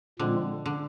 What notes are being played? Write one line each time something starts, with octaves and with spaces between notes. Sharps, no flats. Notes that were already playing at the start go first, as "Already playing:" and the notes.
A#2 D3 F3 G#3 C4 F4
D3